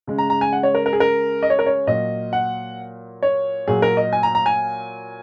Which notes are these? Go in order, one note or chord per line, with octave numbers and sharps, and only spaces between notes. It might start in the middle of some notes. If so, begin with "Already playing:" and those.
C#3 G#3
A#5
A#5
G#5
F#5
C#5
A#4
A#4
G#4
A#4
D#5
C#5
A#4
C#5
A#2 F#3 D#5
F#5
C#5
A#2 F#3 G#4
A#4
D#5
G#5
A#5
A#5
G#5